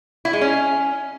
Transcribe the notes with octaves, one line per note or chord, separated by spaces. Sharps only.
E4
G#3
C#4